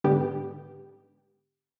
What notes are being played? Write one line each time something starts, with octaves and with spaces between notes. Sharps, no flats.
G#2 D3 B3 G4